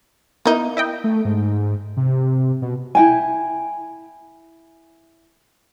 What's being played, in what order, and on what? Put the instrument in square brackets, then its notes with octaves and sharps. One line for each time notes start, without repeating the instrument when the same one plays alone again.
[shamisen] A#3 D#4 [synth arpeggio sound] B3 E4
[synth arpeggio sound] E4 D#5 G5
[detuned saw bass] A3
G#2
C3
B2
[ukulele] E4 G5 G#5